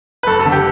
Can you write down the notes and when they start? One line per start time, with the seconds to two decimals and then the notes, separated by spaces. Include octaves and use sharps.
0.23 B4
0.27 F#1 A4
0.40 A4
0.46 D3
0.52 G4